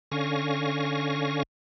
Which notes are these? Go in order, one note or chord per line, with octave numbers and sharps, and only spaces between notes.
D3 C#4 F5 G#5 C#6 A#6